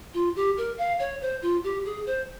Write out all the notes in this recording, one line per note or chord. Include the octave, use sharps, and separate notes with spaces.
F4
G4
A#4
F5
C#5
C5
F4
G4
G#4
C5